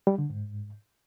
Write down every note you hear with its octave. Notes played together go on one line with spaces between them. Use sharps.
G3
D3
G#2